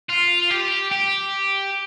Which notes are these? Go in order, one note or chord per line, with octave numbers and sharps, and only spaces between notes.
F4
G4
G4